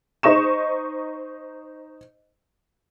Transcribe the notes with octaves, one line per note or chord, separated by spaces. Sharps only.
D#4 C5 D#5 C#6 E7